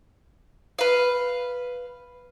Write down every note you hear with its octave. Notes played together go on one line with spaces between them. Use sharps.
B4 F5